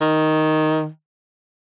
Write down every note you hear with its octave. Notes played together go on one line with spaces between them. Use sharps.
D#3